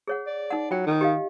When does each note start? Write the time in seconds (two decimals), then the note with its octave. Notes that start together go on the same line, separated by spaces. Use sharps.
0.07 G#4 C#5 F#5
0.27 D5
0.50 D#4 F#5
0.71 F#3 F4 G5
0.87 D#3
1.01 G4 D#5 F5